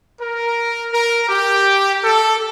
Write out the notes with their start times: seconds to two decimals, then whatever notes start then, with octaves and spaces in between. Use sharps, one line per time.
0.19 A#4
0.93 A#4
1.29 G4
2.03 A4